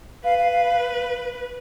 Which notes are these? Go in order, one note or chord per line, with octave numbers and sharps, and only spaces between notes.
B4 F5
F5
F5
F5